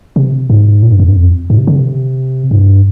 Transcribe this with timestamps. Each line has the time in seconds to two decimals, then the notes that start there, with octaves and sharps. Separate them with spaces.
0.16 C3
0.50 G#2
0.83 A#2
0.92 G2
1.00 F2
1.08 G2
1.17 F2
1.50 G#2
1.58 C3
1.67 D3
1.75 C3
2.51 G2